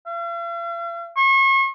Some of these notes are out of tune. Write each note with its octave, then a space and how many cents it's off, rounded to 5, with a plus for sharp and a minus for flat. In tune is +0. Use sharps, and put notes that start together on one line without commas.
F5 -45
C#6 -40